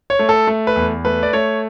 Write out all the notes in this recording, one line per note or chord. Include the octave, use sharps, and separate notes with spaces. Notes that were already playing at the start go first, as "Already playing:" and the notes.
C#5
A3
A4
A3
B4
E2
A3 B4
D5
A3 C#5